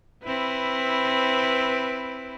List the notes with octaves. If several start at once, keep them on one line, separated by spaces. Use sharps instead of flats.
C4 E4 B4